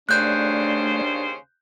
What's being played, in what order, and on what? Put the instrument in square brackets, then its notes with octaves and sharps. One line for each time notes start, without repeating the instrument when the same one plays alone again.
[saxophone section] D#2 C#3 C5 [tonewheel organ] A3 D5 [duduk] D4 [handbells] F#6 G6